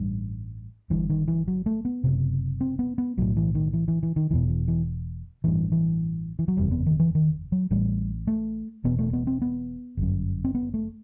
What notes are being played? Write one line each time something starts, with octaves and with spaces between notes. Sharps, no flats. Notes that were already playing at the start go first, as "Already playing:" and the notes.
Already playing: A1 G2 G3
G1 G2 E3
D#3
E3
F#3
A3
B3
F#1 E2 C3
C4
B3
B3
B1 A2 F#3
E3
D#3
E3
E3
E3
D#3
E1 E2 B2 E3
E3
E3
A1 G2 E3
E3
E3
F#3
F#1 E2 C3 G3
B3
D#3
E3
D#3
F#3
A1 A2 G3
A3
E1 E2 B2 B3
A3
B3
C4
B3
G1 F#2
C4
B3
A3